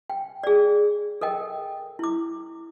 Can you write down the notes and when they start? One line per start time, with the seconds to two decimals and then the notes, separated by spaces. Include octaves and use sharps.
0.10 G5
0.44 G#4 D5
1.21 A4 A#4 D#5 G5
1.99 E4 D6